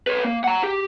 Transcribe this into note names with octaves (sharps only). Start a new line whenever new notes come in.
B4 C#5
A#3
F#5 A#5
G4